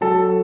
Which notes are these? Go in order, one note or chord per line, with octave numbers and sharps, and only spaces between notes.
F#3 A4